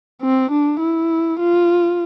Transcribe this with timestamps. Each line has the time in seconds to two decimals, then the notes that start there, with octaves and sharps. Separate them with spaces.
0.22 C4
0.52 D4
0.81 E4
1.40 F4